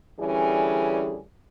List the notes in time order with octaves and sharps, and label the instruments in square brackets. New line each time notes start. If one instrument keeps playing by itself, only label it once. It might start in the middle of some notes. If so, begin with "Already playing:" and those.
[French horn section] D3 E3 G3 C#4 G#4